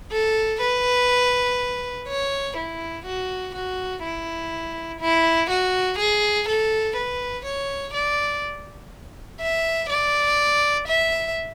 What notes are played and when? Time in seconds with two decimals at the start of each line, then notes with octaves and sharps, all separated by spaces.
0.12 A4
0.61 B4
2.08 C#5
2.56 E4
3.06 F#4
3.55 F#4
4.03 E4
5.01 E4
5.50 F#4
5.99 G#4
6.48 A4
6.96 B4
7.45 C#5
7.94 D5
9.40 E5
9.89 D5
10.88 E5